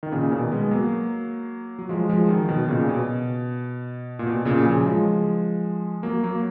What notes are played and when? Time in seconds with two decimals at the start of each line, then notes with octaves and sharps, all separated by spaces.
0.03 D#3
0.12 A#2 C#3
0.32 B2 D#3
0.52 G#3 B3
0.71 F#3 A#3
1.79 F#3
1.89 F3 G#3
2.09 F3 G#3
2.29 D#3 F#3
2.48 B2 D#3
2.68 A#2 C#3
2.89 B2
4.19 A#2
4.27 B2
4.45 A#2 C#3
4.65 C#3 F3
4.80 F#3
4.85 F3 G#3
6.03 F#3 A#3
6.23 F#3 A#3